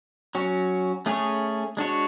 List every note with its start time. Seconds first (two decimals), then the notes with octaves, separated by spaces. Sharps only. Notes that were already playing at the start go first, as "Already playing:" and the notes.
0.35 F#3 C#4 F#4
1.06 A3 C#4 G#4 C#5
1.77 G#3 D4 F#4 C#5